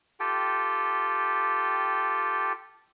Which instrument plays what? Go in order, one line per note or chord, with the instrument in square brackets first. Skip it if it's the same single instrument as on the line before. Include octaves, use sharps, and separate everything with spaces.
[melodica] F4 G4 A4 G5